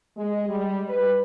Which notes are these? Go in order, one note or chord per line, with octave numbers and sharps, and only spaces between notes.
G#3
G3
B4